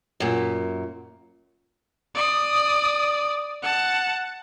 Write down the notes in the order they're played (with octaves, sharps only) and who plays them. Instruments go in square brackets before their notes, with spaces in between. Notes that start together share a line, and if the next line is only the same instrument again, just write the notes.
[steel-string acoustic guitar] F#2 A#2
[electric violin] D5 D#6
F#5 A5